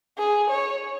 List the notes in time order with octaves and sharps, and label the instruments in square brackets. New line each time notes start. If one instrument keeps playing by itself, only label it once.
[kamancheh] G#4
C#5